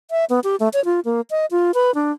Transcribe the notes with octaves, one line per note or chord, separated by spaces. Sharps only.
E5
B3
G4
A3
C#5
F4
A#3
D#5
F4
B4
D4